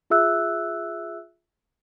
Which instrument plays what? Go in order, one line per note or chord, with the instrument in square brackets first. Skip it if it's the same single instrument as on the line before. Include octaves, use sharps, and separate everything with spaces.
[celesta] F4 G#4 E5 E6 F#6